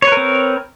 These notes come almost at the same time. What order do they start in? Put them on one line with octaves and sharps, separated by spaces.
C#5 B4 A#4 C4